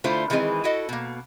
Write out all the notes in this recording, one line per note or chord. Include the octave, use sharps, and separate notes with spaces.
D3 A3 E4 F4 C5
D#3 E3 G#3 C4 G#4
E4 F#4 A4 D#5
B2 A#3